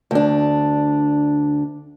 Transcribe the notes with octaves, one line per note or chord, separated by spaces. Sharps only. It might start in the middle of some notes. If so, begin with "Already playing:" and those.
D2 D4